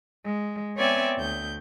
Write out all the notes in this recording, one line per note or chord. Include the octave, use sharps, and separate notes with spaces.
G#3
B3 C4 C#5 D5 E5 G#5
D2 G6